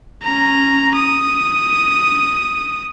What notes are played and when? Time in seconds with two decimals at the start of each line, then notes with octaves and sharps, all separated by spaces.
0.23 C#4 A#5
0.96 D#6